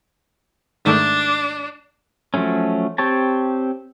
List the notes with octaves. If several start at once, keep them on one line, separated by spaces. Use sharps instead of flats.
G#2 D#3 A3 D4
F3 F#3 A3 C#4
C4 G4 C#5 A5